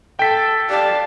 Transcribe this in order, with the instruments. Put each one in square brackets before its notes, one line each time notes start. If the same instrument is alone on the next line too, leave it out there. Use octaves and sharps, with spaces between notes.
[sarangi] A4 [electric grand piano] G5 B6
[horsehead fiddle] G4 A5 [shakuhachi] D5 [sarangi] F5